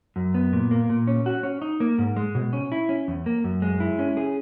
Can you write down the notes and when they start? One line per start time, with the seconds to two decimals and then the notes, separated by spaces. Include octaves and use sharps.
0.16 F#2
0.34 B3
0.53 A#2
0.71 A#3
0.89 A#2
1.07 C#4
1.26 F#4
1.43 C#4
1.62 D#4
1.80 A#3
1.98 G#2
2.17 G#3
2.35 B2
2.53 C#4
2.72 E4
2.89 C#4
3.08 E2
3.26 A#3
3.44 F#2
3.62 G#3
3.80 E4
3.99 C#4
4.17 G#4